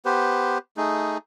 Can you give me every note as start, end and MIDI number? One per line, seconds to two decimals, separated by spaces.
0.05 0.58 59
0.05 0.58 67
0.05 0.58 71
0.05 0.58 72
0.77 1.18 57
0.77 1.18 63
0.77 1.18 68